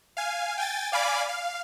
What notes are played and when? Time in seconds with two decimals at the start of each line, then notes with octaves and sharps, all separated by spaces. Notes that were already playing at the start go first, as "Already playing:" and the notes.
0.17 F5 G#5
0.58 G5 G#5 A6
0.92 D5 F5 G#5 B5 D6
1.28 F5